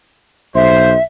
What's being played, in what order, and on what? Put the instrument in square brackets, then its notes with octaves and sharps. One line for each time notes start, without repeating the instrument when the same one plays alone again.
[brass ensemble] B1 C5 [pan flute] E5